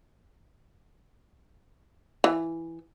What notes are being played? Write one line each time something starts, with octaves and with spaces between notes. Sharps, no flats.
E3